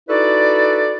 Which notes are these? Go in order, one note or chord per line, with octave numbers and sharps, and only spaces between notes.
D#4 E4 F#4 A4 B4 D5